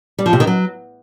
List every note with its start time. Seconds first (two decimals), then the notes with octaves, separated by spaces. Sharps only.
0.19 G3
0.26 F3
0.33 C3
0.40 D#3
0.47 F#3